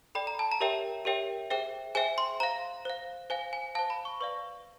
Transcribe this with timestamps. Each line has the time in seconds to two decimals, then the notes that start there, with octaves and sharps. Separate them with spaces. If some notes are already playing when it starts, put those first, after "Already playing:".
0.15 A4 D5 G5 B5
0.27 A#5
0.39 A5
0.52 A#5
0.60 G4 A#4 C#5 E5 G5
1.05 G4 A#4 C#5 E5 G5
1.50 G#4 C5 E5 G5
1.95 G#4 C5 E5 G5 G#5
2.18 C6
2.40 C5 F5 A#5
2.85 C5 F5
3.30 C5 F5 G#5
3.53 G#5
3.75 C5 F5 A5
3.90 B5
4.05 C#6
4.20 B4 D5 F5 C#6